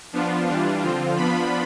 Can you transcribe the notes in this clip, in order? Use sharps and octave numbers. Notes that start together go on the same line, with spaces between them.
F3 B3 D4 F4
E3 G3 D4 F4
D3 F3 C4 F4
F3 B3 D4 F4 B5